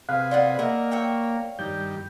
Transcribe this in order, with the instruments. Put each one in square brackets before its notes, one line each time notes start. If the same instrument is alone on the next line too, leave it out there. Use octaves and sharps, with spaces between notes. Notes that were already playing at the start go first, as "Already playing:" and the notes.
[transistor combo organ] C3 G#4 B4 [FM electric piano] F5 [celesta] F#6
[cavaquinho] F4 D#5 F#5 [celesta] D5
[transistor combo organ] A#3 [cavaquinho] D#5 E5 F#5
[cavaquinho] C#5 E5 G5
[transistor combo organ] G2 D#3 G3 [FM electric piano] G6